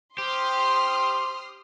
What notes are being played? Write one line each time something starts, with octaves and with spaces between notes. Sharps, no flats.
G4 C5 C6 D#6 F6